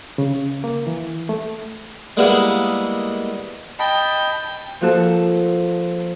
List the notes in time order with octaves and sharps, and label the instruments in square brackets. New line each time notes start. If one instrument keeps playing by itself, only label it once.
[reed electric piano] C#3
A#3
E3
A3
[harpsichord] G3 G#3 A#3 B3 E4 G#4
[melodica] D#5 A5 B5 [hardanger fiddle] G5
[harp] F3 A#3 F#4 A4